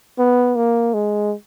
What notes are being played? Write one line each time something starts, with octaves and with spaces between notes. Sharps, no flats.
B3
A#3
G#3